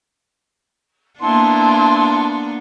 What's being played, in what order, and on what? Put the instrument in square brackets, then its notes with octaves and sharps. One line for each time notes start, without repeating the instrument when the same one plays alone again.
[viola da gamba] A#3 B3 D4 [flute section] E4 A5 C6